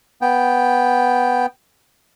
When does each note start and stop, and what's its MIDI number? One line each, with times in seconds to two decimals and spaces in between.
0.22 1.46 59
0.22 1.46 79